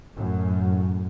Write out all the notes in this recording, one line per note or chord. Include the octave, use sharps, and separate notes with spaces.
F#2 A2